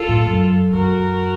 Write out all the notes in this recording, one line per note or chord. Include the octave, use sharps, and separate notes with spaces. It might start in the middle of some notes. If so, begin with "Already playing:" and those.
Already playing: F4 A4
A2
F#2
F#2 F#4 A#4